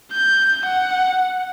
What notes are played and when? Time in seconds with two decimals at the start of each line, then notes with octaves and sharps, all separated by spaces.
0.12 G6
0.66 F#5